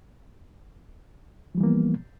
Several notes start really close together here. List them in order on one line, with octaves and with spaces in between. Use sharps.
F3 G3 E3 A#3 B3